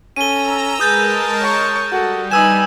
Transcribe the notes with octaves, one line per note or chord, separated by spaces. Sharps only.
C#4 A4 A#5 E6 D#7 G7
G#3 G#4 A#4 B4 A5 D#6 G6 A6
C#5 C#6
G3 F#4 A4
D#4 B4 G#5 D#6 E6 E7